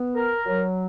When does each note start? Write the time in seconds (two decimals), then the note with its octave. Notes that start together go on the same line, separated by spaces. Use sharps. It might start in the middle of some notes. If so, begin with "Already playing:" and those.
Already playing: B3
0.14 A#4
0.46 F#3